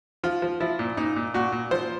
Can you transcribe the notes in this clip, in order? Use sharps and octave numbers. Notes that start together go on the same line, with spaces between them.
F3 F4
F3
F3 E4
A#2
A#2 D#4
A#2
A#2 F#4
A#2
F3 C5